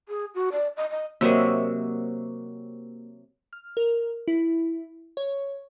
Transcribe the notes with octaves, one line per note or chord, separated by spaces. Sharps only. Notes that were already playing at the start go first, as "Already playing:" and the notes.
G#4
F#4
D5
D#5
D#5
C3 F#3 A#3 A#4 E5
F6
A#4
E4
C#5